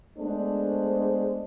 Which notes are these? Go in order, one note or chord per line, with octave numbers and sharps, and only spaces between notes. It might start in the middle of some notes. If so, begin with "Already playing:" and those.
G#3 A3 B3 D4 C5